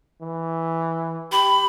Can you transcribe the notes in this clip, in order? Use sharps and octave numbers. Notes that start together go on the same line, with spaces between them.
E3
G4 B5